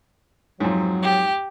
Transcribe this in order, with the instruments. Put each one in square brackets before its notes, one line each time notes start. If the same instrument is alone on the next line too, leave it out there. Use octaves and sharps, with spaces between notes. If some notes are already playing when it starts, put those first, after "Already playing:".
[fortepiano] F2 G#2 [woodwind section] F#3
[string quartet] G4